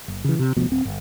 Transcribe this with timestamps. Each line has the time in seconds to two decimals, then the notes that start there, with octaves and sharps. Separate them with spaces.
0.08 F#1
0.24 C#3 E3
0.39 C3
0.56 G#1 D2 B2 F3
0.69 D1 C4
0.85 G1